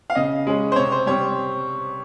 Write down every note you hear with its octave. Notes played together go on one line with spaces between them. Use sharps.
F5
C#3 D#5
G#3 C#4
C5
C3 C#5
C5
G3 C4 C#5